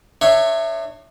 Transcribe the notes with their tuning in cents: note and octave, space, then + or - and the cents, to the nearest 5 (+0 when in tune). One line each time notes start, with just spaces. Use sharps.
D4 +45 C#5 +0 E5 +0